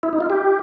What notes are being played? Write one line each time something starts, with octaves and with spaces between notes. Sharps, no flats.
E4
D#4
F4
G4